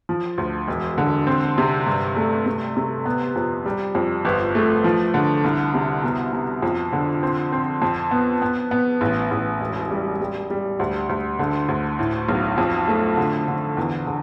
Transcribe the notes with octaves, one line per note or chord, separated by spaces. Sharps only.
F3
D2
E1
D3
C4
C3
G2
A3
C3
C3
B3
F2
G3
F2
G1
A3
F3
D3
C2
C3
B2
B2
F2
D3
C4
C4
F2
B3
B3
B3
A1
A1
E1
G3
G3
G3
D2
D2
D3
D2
A2
B1
F2
A3
D3
D3
E2
D3